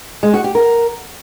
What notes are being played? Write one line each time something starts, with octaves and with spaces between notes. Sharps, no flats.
G#3
F#4
G4
A#4